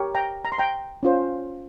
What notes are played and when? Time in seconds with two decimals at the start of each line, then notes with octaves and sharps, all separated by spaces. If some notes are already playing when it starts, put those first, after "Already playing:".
Already playing: G4 A#4 C#5
0.15 G5 A#5
0.45 A#5
0.52 C6
0.58 G5 A#5
1.03 C#4 F4 C5